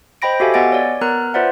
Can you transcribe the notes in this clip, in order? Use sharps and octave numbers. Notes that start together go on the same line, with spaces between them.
C5 D#5 G5 B5 A#6 D7
F#4 G4 A4 E5 F5 G#5
B3 D#5 F#5 G#5 A6 D7
C#5 D5
B3 A#4 A#5 F#6
F4 B4 C5 D5 E5 F#5